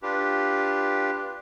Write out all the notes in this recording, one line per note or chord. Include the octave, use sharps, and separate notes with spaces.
D4 F4 G4 B4